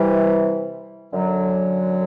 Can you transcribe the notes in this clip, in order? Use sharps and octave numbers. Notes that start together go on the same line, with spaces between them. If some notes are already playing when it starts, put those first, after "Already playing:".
Already playing: C3 E3 G3
F#2 D3 F#3